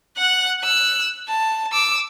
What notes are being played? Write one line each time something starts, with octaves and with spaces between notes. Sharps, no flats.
F#5 F#6
E6 F#6
A5
D6 E6